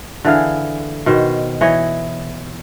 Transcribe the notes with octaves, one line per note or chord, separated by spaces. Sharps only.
D3 E3 G#4 F5
B2 D#3 C5
E3 C#5 D#5